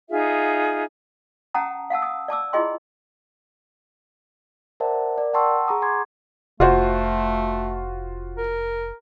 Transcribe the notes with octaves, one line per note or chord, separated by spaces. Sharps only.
D#4 F4 G#4 E5
C#4 F#5 G5 A5 A#5 D#6
F5 F#5 A5 E6
D#6
D5 A5 D6 E6
E4 F4 G#4 D#5 G5 C6
A#4 C5 D5 E5 F#5 A5
A#4 D5
F#5 G5 A5 C6 C#6 E6
G#4 F#5 A#5 C#6 D#6
G#5 C6 D6 G#6
F1 A3 F4 F#4 C5
A#4